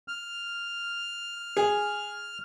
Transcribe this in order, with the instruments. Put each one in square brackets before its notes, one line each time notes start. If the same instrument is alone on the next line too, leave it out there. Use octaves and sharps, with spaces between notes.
[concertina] F6
[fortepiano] G#4